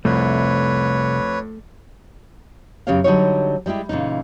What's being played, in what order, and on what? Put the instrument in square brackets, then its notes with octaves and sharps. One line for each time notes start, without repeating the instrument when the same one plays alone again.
[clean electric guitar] C2 [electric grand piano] F2 [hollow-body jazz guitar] A3 [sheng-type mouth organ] B4 C#5
[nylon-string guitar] F#2 C#3 B3 G4 C#5 F5
D3 F#3 G3 D#4 F#4 C#5
G3 G#3 E4 G4
A#2 C#3 E3 D#4